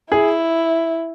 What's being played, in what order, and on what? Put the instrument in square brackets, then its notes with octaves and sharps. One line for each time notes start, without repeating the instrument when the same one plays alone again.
[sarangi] E4 [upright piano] G#4